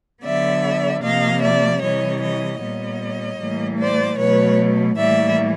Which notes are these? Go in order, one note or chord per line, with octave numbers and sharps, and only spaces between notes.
D3 F#3 B3 D5 E5
C3 F3 A#3 D#5 F5
D5 E5
C3 E3 G3 C#5 D#5
C#5 D#5
A#2 G3 B3 C#5 D#5
A2 E3 G3 A#3
C5 D5
B2 F#3 A3 B4 C#5
A2 E3 G3 A#3 D5 E5